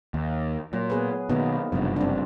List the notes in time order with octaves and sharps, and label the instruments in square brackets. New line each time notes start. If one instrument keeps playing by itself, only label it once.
[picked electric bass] D#2
[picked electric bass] A#2 [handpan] F#3
[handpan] B3 G#4 B4
[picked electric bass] B2 D#3 [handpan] A#3 B3 D#4
[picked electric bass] F#1 G2 [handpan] C3 F3
[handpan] C4 D4